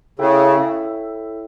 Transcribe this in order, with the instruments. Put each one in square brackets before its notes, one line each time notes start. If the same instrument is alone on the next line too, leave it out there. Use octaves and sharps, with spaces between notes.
[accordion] C#3 [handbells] E4 A4 C#5 E5 G5